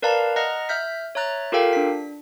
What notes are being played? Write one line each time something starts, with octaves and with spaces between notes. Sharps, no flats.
A#4 B4 D5 F5 A5 A#5
D#5 F#5 A#5 F6 F#6 A#6
E5 F6 G6 B6
C#5 E5 A#5 F#6 A6
F4 G4 A4 A#4 F5 G5
D4 B6